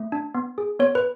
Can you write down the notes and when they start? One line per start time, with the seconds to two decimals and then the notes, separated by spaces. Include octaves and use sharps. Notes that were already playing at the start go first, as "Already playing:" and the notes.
Already playing: A3
0.12 D4
0.35 B3
0.58 G#4
0.79 B3 C#5
0.95 B4